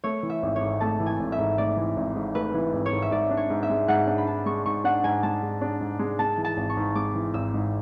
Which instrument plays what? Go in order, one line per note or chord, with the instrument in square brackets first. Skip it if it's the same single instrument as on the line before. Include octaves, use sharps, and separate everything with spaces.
[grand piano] A3 [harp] C#5
[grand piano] E3
[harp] E5
[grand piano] G#1
[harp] C#5
[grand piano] G#2
[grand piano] A3 [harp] A5
[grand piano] E3
[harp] G#5
[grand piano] G#1
[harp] E5
[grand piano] G#2
[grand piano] A3 [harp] D5
[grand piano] E3
G#1
G#2
[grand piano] A3 [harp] B4
[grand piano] E3
G#1
[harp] C#5
[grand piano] G#2
[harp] E5
[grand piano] G#2 [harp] D5
[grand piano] D4
[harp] C#5
[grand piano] G#2
[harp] E5
[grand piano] G#3
[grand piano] G#2 [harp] F#5
[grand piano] D4
[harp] B5
[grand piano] G#2 [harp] A5
[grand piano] G#3 [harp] C#6
[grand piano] G#2 [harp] C#6
[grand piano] D4 [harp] F#5
[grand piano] G#2 [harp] G#5
[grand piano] G#3 [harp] A5
[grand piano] G#2
D4
G#2
G#3
[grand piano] G#3 [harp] A5
[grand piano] E3
[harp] A5
[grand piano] G#1
[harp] C#6
[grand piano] G#2
[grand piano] G#3 [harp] D6
[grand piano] E3
[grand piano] G#1 [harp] E6
[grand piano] G#2